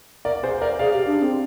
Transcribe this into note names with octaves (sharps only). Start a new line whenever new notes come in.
A#4 D5
G#4 C5
A#4 D5
G#4 D5 F5
G4
D4
C4